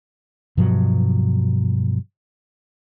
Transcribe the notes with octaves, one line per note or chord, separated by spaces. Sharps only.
G2 B2 F3 F#3